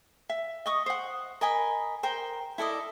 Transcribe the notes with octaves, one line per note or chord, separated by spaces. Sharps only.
E5
D#5 C#6 D#6
C5 F#5
A#4 D#5 G#5 B5
A#4 C5 G5
E4 A4 D5 D#5